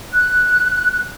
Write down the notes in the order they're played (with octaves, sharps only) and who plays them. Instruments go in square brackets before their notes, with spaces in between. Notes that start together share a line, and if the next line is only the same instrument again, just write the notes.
[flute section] F#6